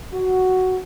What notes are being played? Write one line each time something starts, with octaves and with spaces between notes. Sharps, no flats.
F#4